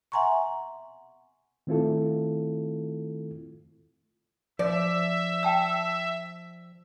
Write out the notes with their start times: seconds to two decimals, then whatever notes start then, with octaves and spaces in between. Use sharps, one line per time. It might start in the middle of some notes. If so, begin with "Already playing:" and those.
0.12 E5 F#5 G#5 A#5 C6 C#6
1.67 D#3 A3 C4 E4 F4 A4
4.59 F3 D5 E5
5.43 G5 A5 E6